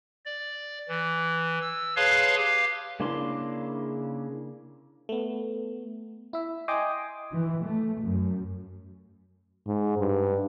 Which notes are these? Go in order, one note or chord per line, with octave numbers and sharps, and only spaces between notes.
D5
E3
E6
G#4 B4 C#5 F5 A5 C6
G4 F5
C#3 A#3 D4 E4 C6
A3 B3
E4 E5
D#5 G5 G#5 C6 D6 D#6
E3
A3
F#2
G#2
G2